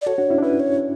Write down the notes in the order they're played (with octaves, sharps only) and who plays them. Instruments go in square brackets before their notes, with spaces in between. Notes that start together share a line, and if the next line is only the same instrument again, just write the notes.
[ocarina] D5
[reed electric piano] F#4 A4 [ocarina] C#5
[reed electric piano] D4 F#4
C#4 E4
D4
[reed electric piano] C#4 E4 [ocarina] B4
[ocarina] C#5